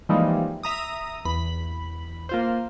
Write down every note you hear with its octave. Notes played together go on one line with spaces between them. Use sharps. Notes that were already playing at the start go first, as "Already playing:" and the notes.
E3 F3 G3 G#3 A#3 D#4
E5 A#5 D#6
E2 B5
A#3 F4 C5